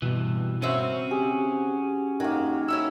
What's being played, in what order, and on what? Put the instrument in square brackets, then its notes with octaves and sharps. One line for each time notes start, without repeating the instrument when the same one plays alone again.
[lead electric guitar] G2 E3 [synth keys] B2
[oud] C#3 C4 E5 [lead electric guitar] C#4 F#4
[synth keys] G4 [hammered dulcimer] G#4
[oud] F#2 F#3 [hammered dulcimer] D#3 A#3
[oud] C#4 E4 F#4 [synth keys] E6